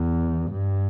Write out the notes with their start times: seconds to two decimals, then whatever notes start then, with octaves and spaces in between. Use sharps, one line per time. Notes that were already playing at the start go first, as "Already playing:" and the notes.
Already playing: E2
0.51 G2